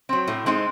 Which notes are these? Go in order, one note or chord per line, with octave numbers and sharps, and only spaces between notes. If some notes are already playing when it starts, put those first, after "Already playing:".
F#3 C4
A2
G#3 C4 D#4